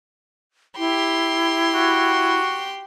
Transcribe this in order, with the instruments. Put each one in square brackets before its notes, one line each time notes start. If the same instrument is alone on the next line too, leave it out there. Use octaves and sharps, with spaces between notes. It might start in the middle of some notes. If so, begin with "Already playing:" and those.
[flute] E4 [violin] G4 C6
[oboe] F#4